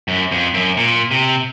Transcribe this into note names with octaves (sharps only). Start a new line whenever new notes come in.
F#2
F2
F#2
A#2
C3